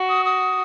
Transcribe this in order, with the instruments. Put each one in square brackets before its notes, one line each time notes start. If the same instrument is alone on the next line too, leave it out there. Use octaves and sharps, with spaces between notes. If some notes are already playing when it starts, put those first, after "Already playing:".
Already playing: [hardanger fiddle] F#4
[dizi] D#6
D#6